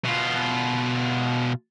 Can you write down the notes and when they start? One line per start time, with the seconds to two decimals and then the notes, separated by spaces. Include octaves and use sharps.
0.05 B2 F4